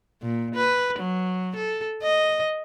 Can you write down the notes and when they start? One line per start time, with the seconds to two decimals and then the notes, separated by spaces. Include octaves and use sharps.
0.22 A#2
0.55 B4
0.99 F#3
1.56 A4
2.02 D#5